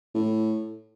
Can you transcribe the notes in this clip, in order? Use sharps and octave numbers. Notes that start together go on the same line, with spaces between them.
A2